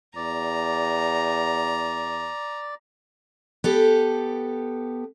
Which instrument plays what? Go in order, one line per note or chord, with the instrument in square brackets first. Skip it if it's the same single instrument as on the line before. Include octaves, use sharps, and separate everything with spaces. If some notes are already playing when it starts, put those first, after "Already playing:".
[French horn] E2 [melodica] D5 [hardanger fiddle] A#5
[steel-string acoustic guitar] B3 G4 A4